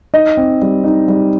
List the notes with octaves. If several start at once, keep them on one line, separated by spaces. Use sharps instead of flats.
D#4 D#5
C4
G3
D#4
G3